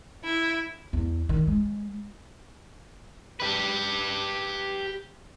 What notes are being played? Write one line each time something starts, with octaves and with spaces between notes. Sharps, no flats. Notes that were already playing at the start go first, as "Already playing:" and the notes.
E4
E2
D#3
G#3
G4 B4